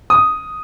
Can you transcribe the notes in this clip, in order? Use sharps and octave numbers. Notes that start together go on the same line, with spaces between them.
D#6